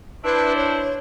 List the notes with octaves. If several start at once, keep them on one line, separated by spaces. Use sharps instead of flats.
D4 E4 B4 C5
C#5